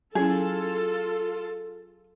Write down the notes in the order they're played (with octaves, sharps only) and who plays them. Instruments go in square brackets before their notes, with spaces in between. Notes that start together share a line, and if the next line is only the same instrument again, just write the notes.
[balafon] F#3 C#4 E4 [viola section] F4 A4 [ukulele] G#4